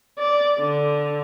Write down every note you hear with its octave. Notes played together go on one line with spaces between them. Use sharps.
D5
D3